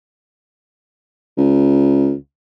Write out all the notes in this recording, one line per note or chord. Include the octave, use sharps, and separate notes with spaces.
C#2